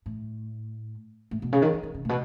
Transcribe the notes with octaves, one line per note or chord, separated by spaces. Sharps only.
A2
A2
B2
C#3
D#3
E3
D#3
C#3
A2
B2